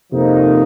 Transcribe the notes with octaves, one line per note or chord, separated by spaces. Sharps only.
F2 C3 F3 A#3 D#4